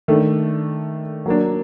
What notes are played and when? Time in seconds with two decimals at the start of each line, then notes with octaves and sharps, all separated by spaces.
0.08 D#3 A3 D4
1.26 F#3 A#3 D4